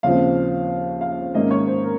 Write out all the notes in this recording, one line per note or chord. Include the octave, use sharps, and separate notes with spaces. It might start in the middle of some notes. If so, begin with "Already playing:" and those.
D#2 C#3 F3 C4 F5
F5
G#2 D#3 A#3 C#4 D#5
C#5
C5
A#4